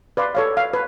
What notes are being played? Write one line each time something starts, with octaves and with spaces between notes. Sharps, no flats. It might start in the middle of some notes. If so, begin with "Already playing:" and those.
B4 D5 F5 C6
A4 C#5 F5
F5
B4